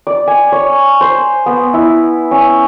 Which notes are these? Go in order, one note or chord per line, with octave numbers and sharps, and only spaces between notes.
D5
G#5
C#5
C5
B3
E4
C#4